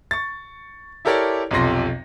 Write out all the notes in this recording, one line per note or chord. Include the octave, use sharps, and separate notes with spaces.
C#6 A6
E4 G4 A4 A#4 C#5 D5
B1 F2 C3 F3 C6 A#6